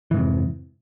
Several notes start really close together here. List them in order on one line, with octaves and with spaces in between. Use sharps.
E3 G#2 C3 F2